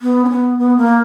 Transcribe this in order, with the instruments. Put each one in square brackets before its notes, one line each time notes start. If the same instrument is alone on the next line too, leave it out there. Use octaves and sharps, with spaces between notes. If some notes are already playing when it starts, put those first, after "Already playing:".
[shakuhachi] B3
C#4
B3
B3
A#3